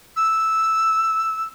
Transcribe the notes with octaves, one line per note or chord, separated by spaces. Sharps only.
E6